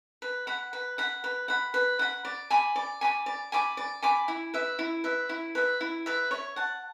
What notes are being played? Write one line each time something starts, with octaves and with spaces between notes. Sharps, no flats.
B4
F#5 B5
B4
F#5 B5
B4
F#5 B5
B4
F#5 B5
D5
G#5 B5 D6
D5
G#5 B5 D6
D5
G#5 B5 D6
D5
G#5 B5 D6
E4
B4 E5
E4
B4 E5
E4
B4 E5
E4
B4 E5
C#5
F#5 A5